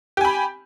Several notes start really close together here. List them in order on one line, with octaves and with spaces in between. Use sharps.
G4 G#5 B5